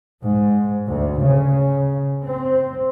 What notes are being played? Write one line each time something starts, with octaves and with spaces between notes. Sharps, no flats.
G#2
D2
C#3
C4